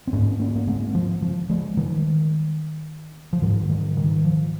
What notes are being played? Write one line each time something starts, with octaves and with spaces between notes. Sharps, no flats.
C4
G#2 A#3 C#4
A#3 C#4
A#3
G#3 C4
F3
F3
F3 G#3
D#3 G3
F3
G#2 D#3 G3
D#3 G3
D#3 G3
F3